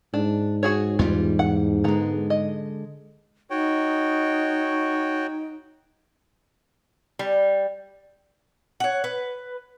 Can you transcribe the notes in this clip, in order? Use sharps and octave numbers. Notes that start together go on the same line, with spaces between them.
G#2 D4
F#4 G#4 C#5
E2 E3 G3 F4
F#5
D3 G#3 B3 A#5
D#5
D#4 F#4 C#5 G5
G3
C#5 F#5
B4